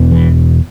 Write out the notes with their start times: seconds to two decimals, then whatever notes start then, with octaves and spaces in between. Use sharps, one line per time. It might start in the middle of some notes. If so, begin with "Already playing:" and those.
Already playing: E1 E2 B2
0.11 E3